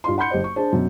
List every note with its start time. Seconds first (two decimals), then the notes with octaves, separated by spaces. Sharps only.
0.04 G2 F4 C6
0.18 F#5 B5 C6 G6 C#7
0.30 F#1 G4 C5 D#5
0.44 C#6
0.56 D4 G#4 C5 A5
0.72 F#2 B2